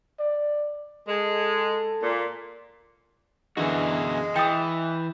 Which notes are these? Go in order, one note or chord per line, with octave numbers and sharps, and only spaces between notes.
D5
G#3 A4
A#2
F#2 B2 D3 E3 G#3 E4 F#4
E3 G5 D#6 G6 A6